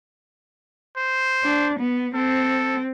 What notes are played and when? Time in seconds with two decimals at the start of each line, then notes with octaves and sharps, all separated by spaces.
0.97 C5
1.44 D4
1.79 B3
2.15 C4 A4